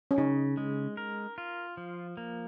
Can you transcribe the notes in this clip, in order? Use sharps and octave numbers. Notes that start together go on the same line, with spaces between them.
C#4
C#3 D#4
G#3
A#4
F4
F3
A#3